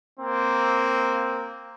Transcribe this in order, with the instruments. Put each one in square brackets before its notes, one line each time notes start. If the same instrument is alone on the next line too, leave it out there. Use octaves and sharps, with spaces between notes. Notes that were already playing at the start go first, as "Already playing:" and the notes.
[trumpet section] A#3 C4